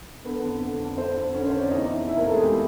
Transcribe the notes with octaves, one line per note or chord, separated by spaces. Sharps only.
D3 B3 B4
F2
D3
F2
D3 C4 C5
F2
D3 C#4 C#5
C5
F2 C#5
D5
E2 D#4 D#5
E3
C3 E4 E5
A#3 A#4
E2 A3 A4
G#3 G#4
E2 G3 G4